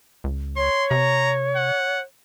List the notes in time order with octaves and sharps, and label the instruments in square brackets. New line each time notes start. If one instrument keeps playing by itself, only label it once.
[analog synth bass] C#2
[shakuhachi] C#5 [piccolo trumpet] C6
[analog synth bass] C3 [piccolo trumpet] A#5
[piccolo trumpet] F#5